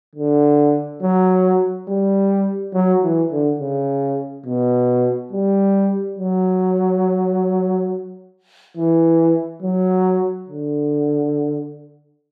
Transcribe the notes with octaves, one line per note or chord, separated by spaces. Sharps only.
D3
F#3
G3
F#3
E3
D3
C#3
B2
G3
F#3
E3
F#3
D3